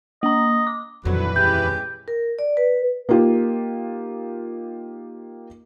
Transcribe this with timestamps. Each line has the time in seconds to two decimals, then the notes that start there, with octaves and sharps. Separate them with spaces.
0.23 A#3 D#5 A#5
0.67 D6
1.05 D#1 F2 D3 E3 F#3 B4
1.36 G#3 C#4 G4 G6
2.08 A#4
2.39 D5
2.57 B4
3.09 A#3 D#4 F4 G4